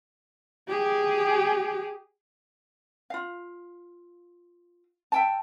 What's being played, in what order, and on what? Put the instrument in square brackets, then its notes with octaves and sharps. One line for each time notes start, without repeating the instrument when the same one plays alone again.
[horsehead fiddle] G4 G#4
[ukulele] F4 F5
E5 G5 A5